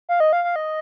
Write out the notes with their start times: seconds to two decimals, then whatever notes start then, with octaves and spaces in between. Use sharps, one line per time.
0.09 F5
0.20 D#5
0.33 F5
0.44 F5
0.56 D#5